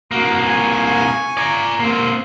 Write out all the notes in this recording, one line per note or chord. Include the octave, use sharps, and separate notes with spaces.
C2 A#3 F#4
G#5 C#6
D5 A#5
A#3 C4